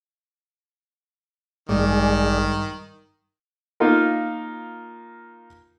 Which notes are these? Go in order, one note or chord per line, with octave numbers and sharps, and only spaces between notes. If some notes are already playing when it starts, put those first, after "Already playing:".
A1 G2 D#3 G#3 G#4 D5
A#3 D#4 F4 A#4